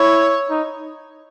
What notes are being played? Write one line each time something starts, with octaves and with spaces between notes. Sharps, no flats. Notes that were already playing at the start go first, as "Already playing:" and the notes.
Already playing: E4 C#5
D#4